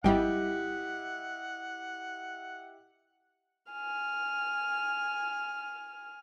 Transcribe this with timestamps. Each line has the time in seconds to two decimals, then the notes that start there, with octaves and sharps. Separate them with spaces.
0.04 G#1 G3 E4 G4 D#5 F#5 G5
3.72 G#5 F6